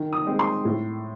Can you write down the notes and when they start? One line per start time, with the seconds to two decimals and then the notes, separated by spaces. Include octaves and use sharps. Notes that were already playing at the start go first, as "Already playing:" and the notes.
Already playing: D#3
0.13 D#6
0.26 G#3 C4
0.39 C6
0.65 A2